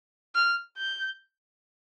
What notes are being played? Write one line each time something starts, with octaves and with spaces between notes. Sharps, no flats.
F6
G6